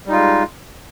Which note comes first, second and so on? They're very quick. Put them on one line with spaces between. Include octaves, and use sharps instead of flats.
G3 D#4 F4 G#3